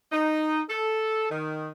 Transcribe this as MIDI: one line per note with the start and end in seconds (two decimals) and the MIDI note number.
0.12 0.61 63
0.69 1.27 69
1.30 1.70 51